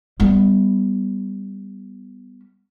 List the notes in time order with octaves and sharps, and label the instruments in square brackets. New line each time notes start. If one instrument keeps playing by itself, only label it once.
[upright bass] G3 B3